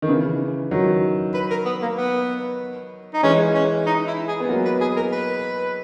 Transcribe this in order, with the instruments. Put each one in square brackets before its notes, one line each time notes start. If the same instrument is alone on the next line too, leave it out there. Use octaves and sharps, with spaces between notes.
[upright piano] D#3
C#3 E3
D#3 F#3
[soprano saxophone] B4
A#4
B3
A#3
B3
D#4
[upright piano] E3 G#3 [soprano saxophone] C#4
[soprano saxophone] C#4
D#4
E4
G#4
[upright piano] B3
F#3 A#3
[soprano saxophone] B4
G#4
A#4
B4